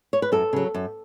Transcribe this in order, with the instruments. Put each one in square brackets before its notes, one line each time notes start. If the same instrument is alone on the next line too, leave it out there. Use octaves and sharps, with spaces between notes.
[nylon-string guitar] C#5
B4
F#2 A4
C#3 F#3
F#2